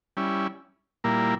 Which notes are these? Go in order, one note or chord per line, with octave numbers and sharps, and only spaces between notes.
G3 C#4 E4
A#2 G3 A#3 E4